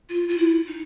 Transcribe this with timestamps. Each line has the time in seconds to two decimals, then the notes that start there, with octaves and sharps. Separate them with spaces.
0.09 F4
0.28 F4
0.37 E4
0.67 D#4